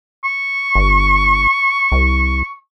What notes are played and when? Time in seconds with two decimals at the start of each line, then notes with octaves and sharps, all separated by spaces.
0.24 C#6
0.75 G1
1.92 C2